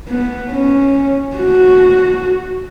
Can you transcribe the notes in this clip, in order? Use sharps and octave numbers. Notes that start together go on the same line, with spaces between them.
B3
C#4
F#4